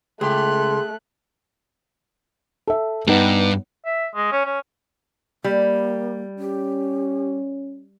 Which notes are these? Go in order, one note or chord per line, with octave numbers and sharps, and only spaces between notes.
C#2 A3 G#4 G5 C6 F#6
A4 E5
G2 B3 D#4 F#5
E5
G#3
C#4
C#4
G3 A#3
C#4 G4